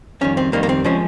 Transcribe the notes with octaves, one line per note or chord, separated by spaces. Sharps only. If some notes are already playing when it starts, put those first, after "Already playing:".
F2 D#3 G3 C#4
C4
F2 D#3 G3 A#3
A#3
C4
F3 G#3 C#4